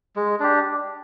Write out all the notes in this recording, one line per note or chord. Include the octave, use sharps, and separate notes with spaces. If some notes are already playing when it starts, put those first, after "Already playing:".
G#3
D4 G4